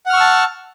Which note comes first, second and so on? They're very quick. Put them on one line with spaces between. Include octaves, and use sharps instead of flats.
F#5 F6 C#6 E6 A5